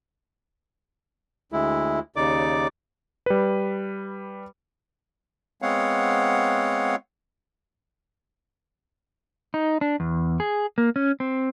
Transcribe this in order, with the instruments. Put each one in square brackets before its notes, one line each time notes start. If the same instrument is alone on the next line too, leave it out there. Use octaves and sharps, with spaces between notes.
[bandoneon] D2 G#3 E4
D#2 C#3 D#4 D5 D6
[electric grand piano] G3 B4
[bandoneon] G#3 B3 C4 C#5 F5 F#5
[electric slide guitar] D#4
D4
E2
G#4
A#3
C#4
C4